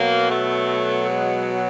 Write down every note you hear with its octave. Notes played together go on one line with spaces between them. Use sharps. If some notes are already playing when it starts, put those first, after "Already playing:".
Already playing: B2 F#3 A#3
A3
G#3